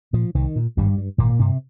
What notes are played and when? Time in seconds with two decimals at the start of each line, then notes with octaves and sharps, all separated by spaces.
0.13 A#2 F3
0.35 C2 D#3
0.56 A#2
0.77 G#1 G2 G3
0.98 G2
1.18 G#1 A#2 A#3
1.39 G2 C3 C4